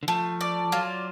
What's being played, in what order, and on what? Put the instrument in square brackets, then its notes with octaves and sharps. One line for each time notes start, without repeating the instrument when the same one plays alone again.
[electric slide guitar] D3
[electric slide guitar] F3 [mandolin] A3
[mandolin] D5
[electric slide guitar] F#3 [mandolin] F4